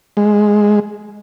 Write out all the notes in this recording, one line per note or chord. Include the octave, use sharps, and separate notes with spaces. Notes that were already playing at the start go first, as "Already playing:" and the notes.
G#3